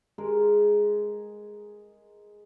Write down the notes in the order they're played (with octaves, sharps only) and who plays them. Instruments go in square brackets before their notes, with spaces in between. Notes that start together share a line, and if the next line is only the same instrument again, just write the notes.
[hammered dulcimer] G#3 G#4 A#4